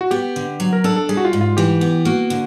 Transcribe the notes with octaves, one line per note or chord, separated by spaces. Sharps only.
F#4
B3 G4
D3
F#3
A#4
D4 A4
A4
G3 G#4
F#4
F4
G#2
F4
E3 G4
B3
A#3 F#4
D3